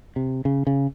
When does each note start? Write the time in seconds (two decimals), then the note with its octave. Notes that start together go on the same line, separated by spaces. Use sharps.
0.16 C3
0.45 C#3
0.67 C#3